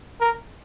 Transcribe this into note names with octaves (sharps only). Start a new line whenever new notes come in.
A#4